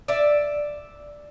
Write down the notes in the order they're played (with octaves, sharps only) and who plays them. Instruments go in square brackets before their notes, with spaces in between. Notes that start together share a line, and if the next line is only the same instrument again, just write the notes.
[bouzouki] D5 E5